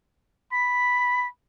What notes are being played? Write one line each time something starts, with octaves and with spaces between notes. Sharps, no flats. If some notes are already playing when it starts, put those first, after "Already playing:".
B5 B6